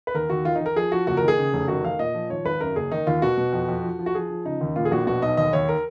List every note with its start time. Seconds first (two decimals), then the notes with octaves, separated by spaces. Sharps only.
0.07 B4
0.14 D#2 A#4
0.30 D#2 F#4
0.45 D#3 F4
0.56 D#4
0.61 D#3
0.66 A#4
0.76 F3 G#4
0.92 F3 F#4
1.07 F#1 F#4
1.17 A#4
1.23 D#3
1.28 G#4
1.38 C#3
1.53 F1
1.68 D#3 F#4
1.84 D#3 F5
1.99 A#2 D#5
2.14 F3
2.30 G#1 C#5
2.45 G#1 B4
2.60 F#2 A#4
2.76 F#1 G#4
2.92 D#3 D#4
3.07 D#2 F4
3.22 B2 F#4
3.37 B2
3.53 F2
3.68 F2
3.84 F3
3.99 F3
4.06 F#4
4.15 F3 G#4
4.30 F3
4.45 C#3 D#4
4.61 D#2
4.76 A#2 F4
4.85 G#4
4.91 A#1 F#4
5.07 B2 F#4
5.22 B1 D#5
5.37 D#2 D#5
5.53 D#2 C#5
5.69 A#4